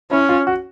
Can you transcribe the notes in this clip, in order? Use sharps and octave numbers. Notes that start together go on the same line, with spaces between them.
C#4 E4
F4
F#4